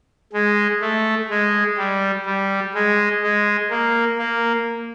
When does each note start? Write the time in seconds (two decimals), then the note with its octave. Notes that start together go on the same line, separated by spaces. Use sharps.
0.33 G#3
0.81 A3
1.30 G#3
1.77 G3
2.26 G3
2.74 G#3
3.22 G#3
3.71 A#3
4.19 A#3